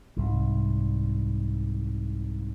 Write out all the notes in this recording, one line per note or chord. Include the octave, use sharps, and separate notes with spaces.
C2 G#2